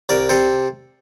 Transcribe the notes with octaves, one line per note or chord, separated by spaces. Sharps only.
C2 A#4 D5
C3 A4 C5